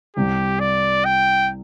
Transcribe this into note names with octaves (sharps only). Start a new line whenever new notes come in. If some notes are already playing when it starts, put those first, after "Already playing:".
C2 C3 G3 G4
D5
G5